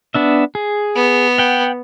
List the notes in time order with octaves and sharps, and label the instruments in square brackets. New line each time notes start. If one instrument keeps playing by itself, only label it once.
[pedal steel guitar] B3 D4 E5
G#4
[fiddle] B3
[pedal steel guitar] F#5 G5